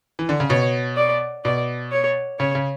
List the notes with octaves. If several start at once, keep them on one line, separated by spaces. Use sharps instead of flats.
E3
D3
C#3
B2 C#5
D5
B2 D5
C#5
C#3 C#5
C#3